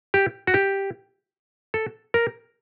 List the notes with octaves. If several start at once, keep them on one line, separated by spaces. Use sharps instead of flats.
G4
F#4
G4
A4
A#4